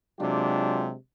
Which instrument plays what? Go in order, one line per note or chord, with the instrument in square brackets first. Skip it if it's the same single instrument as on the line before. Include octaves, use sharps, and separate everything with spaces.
[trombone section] C3 F#3 G#3 D4 F4 G4